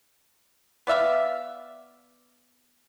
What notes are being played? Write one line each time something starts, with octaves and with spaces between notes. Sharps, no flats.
B3 D5 E5 F5